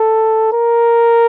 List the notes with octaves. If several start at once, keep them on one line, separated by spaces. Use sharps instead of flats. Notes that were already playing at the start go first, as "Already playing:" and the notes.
Already playing: A4
A#4